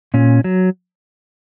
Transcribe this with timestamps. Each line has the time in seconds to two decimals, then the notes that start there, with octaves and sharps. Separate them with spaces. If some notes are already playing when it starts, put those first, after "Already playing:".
0.14 A#2 C#4
0.44 F#3